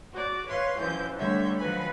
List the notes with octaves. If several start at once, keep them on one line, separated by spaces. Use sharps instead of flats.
F#4 D5
B4 C#5 F5 C6
F#2 E3 F3 G6
D3 G3 A3 C#5 E5 G6
D#3 F3 F#3 B4 G#5 B5